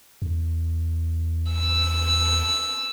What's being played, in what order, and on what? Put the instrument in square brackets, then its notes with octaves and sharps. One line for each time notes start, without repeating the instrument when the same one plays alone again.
[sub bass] E2
[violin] E6